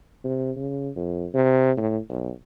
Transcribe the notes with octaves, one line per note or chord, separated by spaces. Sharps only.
C3
C#3
F2
C3
A2
B1